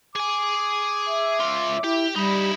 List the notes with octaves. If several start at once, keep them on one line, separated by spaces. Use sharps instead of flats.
G#4 G#5 D6
E5
C#2 F4
E4 G4
G3 D#4 E4 B5